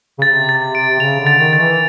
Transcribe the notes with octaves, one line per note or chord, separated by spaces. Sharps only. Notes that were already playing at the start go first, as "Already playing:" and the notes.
C#3
C3 A6
A6
D7
C#3 F7
D3
A6
D#3
A6
E3